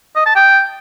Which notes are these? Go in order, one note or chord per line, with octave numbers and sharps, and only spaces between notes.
D#5
A5
G5